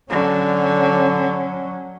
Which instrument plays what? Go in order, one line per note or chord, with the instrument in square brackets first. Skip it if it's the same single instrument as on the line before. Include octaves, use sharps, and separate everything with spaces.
[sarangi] D3 [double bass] F#3 C#4